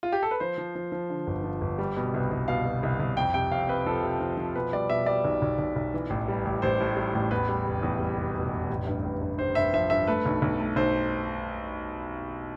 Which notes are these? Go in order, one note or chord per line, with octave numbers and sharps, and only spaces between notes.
F4
G4
A4
B4
F3 C5
F3
F3
F3
D3
G1
F3
G1
G3
B2
C2
C2
B2 F5
B2
C2
C2
F2 G5
C3 G5
F2 F5
F2 B4
F3 A4
C3
F3
F3
B2 B4
G3 D5
B2 E5
G3 D5
B1
B1
B1
B1
E3
A1
G3
A1
A1 C5
A2
G3
A1
E2 B4
G3
F1
E2
G3
F1
B2
F1
A1
G2
A1
G2
G2 C5
G2 E5
F3 E5
G2 E5
A3 B4
B1
B1
A3
B1 C5